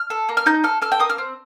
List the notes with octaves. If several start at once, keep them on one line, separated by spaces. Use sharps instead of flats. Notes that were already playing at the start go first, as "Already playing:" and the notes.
Already playing: F6
A4
A#3
F6
D#4 G6
A4 F6
A4 F6
G5
A#3 D#6
F6
C4